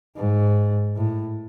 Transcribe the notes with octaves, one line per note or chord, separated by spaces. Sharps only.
G#2
A2